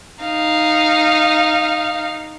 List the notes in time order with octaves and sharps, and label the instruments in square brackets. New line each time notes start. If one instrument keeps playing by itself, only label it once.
[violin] D#4 F5